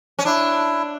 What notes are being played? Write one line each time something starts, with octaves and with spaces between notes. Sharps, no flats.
C#4
D4 E4